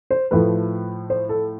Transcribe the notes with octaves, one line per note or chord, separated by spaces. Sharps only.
C5
A2 F3 A3 B4
C5
A4